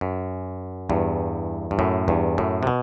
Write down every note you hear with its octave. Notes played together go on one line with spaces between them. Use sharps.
F#2
E2 G2
G2
F#2 A2
E2 G2
F#2 A2
C3
B2